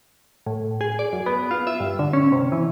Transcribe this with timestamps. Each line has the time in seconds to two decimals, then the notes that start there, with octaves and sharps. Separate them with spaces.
0.46 A2
0.81 G#4
0.99 D5
1.13 F#2
1.26 B3
1.51 F4
1.67 E5
1.80 G2
1.99 D3
2.13 C#4
2.32 C3
2.52 E3